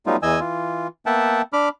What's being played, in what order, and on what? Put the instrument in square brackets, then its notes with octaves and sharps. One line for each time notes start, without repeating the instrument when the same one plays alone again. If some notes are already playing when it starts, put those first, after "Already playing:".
[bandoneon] F#3 G3 A3 B3 D#4 F4
E2 E3 D#5 G#5 E6
E3 F4
A#3 B3 E5 F#5 G5 A5
D4 B5 D6 F6